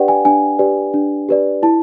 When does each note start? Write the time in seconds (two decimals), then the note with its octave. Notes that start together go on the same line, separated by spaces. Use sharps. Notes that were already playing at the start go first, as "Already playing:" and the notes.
Already playing: D4 G4 B4 D5 F#5 G5
0.08 G#5
0.25 D4 G#5
0.59 G4 B4 D5
0.94 D4
1.29 G4 B4 D5
1.63 E4 A5